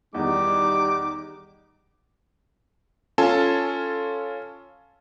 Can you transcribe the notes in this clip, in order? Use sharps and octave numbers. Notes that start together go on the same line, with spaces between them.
E2 D#3 G3 D#4 D6
C#4 F4 A4 G#5 A5